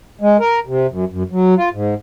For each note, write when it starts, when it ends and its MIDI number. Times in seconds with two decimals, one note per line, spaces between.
0.21 0.37 56
0.40 0.60 70
0.67 0.87 48
0.91 1.05 42
1.09 1.23 42
1.31 1.55 54
1.57 1.69 65
1.73 1.94 44